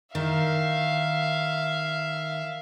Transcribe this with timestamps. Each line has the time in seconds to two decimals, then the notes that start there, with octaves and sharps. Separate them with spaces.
0.15 D#3 E5 F5